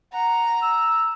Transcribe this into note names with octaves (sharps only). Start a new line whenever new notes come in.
F#5 A#5
E6